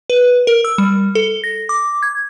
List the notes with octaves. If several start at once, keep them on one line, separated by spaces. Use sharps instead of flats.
B4
A#4
E6
G3
A4
A#6
D6
G#6